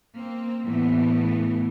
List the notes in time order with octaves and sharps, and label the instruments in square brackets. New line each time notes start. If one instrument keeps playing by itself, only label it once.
[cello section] A#3 C4
A2 E3 A3 B3